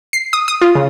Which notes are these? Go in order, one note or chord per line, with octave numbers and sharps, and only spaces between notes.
C7
D#6
D#6
F4
C#3